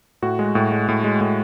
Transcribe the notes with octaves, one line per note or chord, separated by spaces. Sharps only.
A2 F#4
G#3
A2
G#3
A2
G#3
A2